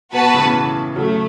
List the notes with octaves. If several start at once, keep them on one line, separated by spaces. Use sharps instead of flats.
B2 F#4 B4 A5
B2
A2 C#3
B2 E3
C#3 F#3 A3